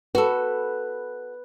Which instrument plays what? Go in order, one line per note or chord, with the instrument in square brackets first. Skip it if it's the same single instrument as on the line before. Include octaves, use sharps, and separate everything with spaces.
[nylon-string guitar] F#4 A4 [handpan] B4